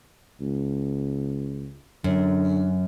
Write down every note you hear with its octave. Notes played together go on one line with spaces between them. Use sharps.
C#2
F#2 D3